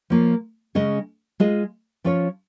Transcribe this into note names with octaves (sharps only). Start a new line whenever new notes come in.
F3 A#3 F4 C#5
C#3 G#3 C#4 G#4 D#5
G#3 F4 G#4 D#5
F3 C#4 F4 C#5